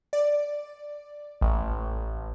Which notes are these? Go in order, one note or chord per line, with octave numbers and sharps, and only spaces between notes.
D5
A1